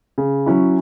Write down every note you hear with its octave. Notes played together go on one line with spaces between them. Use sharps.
C#3
F#3 C#4 E4